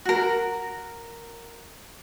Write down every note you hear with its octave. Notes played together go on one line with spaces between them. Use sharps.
F#4 A#4